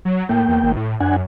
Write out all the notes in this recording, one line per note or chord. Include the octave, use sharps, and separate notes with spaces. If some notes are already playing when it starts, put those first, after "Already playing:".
F#3
A2 A#3 G5
E2
G#1
A2
F#2 D4 F#5 G#5